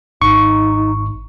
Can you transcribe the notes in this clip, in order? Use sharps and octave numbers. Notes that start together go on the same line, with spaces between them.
G#1 G#2 D#4 C#6